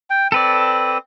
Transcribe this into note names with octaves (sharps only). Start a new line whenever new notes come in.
G5
C4 A4 B4 D5